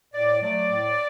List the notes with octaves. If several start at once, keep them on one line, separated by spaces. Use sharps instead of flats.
A2 D5
F#3 A3 D5
A2